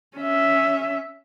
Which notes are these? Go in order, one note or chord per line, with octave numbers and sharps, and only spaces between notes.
C#4 E5